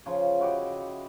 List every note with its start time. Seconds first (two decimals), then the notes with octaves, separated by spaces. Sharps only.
0.06 C#3 F3 C#6
0.40 E4 F#4 G4 D#5